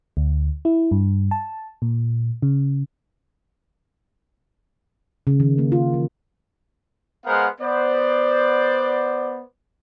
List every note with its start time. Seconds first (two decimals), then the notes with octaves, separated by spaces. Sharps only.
0.17 D2
0.65 E4
0.91 G2
1.31 A5
1.82 A#2
2.42 C#3
5.27 C#3
5.40 D#3
5.58 A#3
5.72 F4
5.94 E3
7.26 G#3 B3 A#4 C5 F5 F#5
7.61 B3 C5 D5